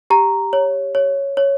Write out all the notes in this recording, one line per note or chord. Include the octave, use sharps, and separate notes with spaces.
G4 A#5
C#5
C#5
C#5